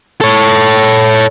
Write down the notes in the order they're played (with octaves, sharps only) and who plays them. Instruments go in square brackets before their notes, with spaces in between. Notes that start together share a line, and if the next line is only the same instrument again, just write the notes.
[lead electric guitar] A4 C#5